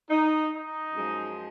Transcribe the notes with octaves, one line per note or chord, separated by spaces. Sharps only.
D#4
D#4
F#2 F3 G#3